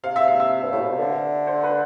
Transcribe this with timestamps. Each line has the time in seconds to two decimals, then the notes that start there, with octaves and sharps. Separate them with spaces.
0.03 C3 F5
0.16 E5
0.28 F5
0.40 E5
0.63 G2
0.72 A2
0.81 B2
0.90 C3
0.99 D3
1.47 C5
1.63 B4